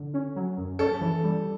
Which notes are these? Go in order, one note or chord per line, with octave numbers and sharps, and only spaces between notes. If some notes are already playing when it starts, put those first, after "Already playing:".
Already playing: D3
C#4
F#3
F#2
C#4 A4
E3
G3